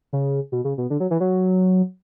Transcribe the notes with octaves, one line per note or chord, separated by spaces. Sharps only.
C#3
B2
C#3
B2
D3
F#3
E3
F#3